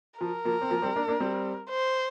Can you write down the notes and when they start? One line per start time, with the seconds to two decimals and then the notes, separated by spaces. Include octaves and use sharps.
0.20 F3 A#4
0.45 F3 A#3
0.61 C4
0.70 F3 A#3
0.82 G3 C4
0.96 A#3 D4
1.08 A#3 D4
1.20 G3 C4
1.70 C5